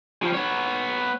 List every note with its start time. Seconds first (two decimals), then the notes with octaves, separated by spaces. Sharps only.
0.22 F3 G3
0.34 B3 C#5